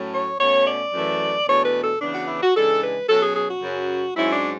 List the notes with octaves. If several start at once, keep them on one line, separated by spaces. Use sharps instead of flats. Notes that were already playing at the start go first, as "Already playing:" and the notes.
Already playing: A2 F#3 A3 C#4
C#5
B2 A3 C#4 C#5
D5
F#2 E3 A3
E2 B2 A3 D4 C#5
B4
A4
C#3 E3 B3 D4
F#4
E4
F#4
C#3 E3 G#3 D4 A4
B4
B2 F#3 C#4 A4
G#4
G#4
F#4
F#2 C#3 F#3
G#2 F#3 C#4 E4
D4